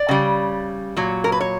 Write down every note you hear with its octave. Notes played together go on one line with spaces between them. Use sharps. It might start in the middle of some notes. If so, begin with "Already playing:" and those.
Already playing: D5
C#3 G3
A#2 F#3
A#4
B4
C#5